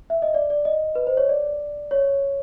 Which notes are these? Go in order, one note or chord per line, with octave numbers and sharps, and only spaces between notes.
E5
D#5
D5
D5
D#5
B4
C5
C#5
D5
C#5